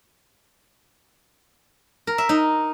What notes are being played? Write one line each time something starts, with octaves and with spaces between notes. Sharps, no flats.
A#4
E5
D#4